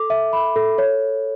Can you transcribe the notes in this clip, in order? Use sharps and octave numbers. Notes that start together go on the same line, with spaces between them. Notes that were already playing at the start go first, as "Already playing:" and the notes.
Already playing: A4 D6
E5
B5
A4
C#5